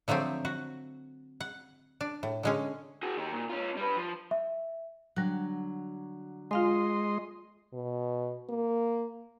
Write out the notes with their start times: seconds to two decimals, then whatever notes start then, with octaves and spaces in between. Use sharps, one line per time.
0.08 D3 F3 F#3 A3 C4
0.45 F#4
1.40 F#5
2.01 D4
2.23 A2
2.43 D3 G#3 C#4
3.03 F#4 G#4
3.17 D#3 G4
3.33 A#2
3.49 C#4 F4
3.77 G3 B4
3.97 F3
4.31 E5
5.16 D3 F#3 G3 F#6
6.51 G#3 F4 D#5 F5 G#5 C6
7.74 B2
8.50 A#3